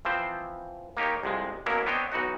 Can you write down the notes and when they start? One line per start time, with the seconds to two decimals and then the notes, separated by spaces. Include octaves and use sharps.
0.05 E3 F3 C4 C5
0.97 A#3 D#4 G4 C#5
1.23 C2 F2 C3 G#3
1.66 B2 F#3 A#3 C#4 E4 A#4
1.86 B3 C4 D4 C#5 D#5 G5
2.12 B1 E3 D#4 F#4 F#5